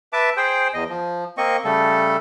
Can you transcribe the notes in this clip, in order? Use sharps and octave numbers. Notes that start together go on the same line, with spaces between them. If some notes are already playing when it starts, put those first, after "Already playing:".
B4 E5 A5 D6
G#4 C5 G5
E2 D#5
F3
A#3 C4 D#5 C#6
C#3 G3 A3 A4